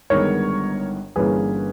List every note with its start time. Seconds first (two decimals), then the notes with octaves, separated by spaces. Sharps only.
0.10 G1 G2 D#3 G#3 B3 A#4 C#5
1.16 G1 G2 E3 A#3 C#4 G#4 B4